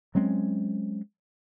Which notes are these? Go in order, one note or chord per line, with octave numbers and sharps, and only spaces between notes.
F#3 G#3 C4 C#4